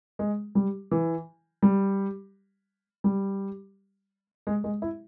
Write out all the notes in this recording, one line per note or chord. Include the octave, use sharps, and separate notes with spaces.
G#3
G3
E3
G3
G3
G#3
G#3
E4